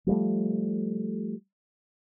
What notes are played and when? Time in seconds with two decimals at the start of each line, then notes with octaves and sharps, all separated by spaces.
0.07 F3 G3 A3